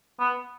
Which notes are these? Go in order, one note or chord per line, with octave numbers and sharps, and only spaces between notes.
B3